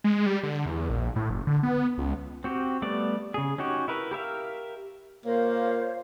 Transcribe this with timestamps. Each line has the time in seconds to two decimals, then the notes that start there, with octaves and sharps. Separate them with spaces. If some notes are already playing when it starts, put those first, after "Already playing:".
0.04 G#3
0.26 G3
0.43 D3
0.66 E2
0.89 A#1
1.16 A2
1.30 F#1
1.47 D3
1.63 B3
1.98 C#2
2.44 C4 F#4 G4
2.82 G3 A3 B3 D5
3.34 C#3 G#4
3.58 C#4 D#4 F#4 G4
3.88 E4 A#4 B4
4.11 G4 A#4 E5 F5
5.25 A#2 A#3 C5 C#5 F5